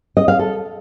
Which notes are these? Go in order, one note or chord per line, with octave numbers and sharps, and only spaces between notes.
D#5
F5
A4